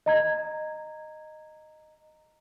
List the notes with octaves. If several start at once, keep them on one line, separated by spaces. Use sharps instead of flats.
D#5 A#5 G#6